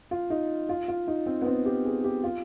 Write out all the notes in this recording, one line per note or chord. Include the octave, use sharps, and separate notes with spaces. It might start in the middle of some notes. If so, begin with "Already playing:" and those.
F4
D#4
F4
F4
D#4
C4
B3
C4
G4
G#4
G4
F4